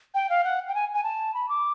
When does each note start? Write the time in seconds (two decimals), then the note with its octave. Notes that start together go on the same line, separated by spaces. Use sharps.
0.14 G5
0.30 F5
0.44 F#5
0.68 G5
0.75 G#5
0.94 G#5
1.04 A5
1.34 B5
1.49 D6